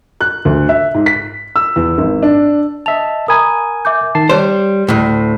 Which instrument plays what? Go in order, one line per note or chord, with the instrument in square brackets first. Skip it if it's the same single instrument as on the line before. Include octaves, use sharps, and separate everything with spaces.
[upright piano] F#6
D2
E5
G#2
B6
E6
E2
G#1
D4
[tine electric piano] D#5 E5 A5 [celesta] F7
[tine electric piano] A#4 G#5 [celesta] A#5 B5 D#6
[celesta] E5 D6 G6
[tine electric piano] D#3 A5 C7
[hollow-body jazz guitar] G3 C5 [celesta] C#5 [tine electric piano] C6
[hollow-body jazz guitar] D2 A2